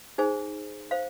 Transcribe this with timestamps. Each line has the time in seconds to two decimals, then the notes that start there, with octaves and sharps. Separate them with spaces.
0.18 D#4 G#4 C5 G#5
0.91 C5 F5